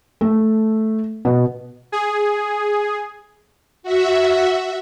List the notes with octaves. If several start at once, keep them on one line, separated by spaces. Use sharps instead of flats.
A3
B2
G#4
F#4 E5